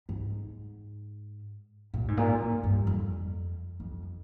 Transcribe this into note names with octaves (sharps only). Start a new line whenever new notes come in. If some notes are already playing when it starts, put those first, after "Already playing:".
G#2
A#2
G#2
A#2
G#2
G2
F2
F2